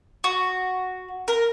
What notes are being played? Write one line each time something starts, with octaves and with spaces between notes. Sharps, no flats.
F#4
A#4